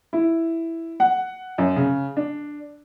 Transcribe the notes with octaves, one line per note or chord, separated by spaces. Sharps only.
E4
F#5
F#2
C#3
D4